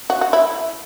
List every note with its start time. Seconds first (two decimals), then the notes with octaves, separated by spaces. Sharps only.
0.10 F#4
0.21 F#4
0.33 E4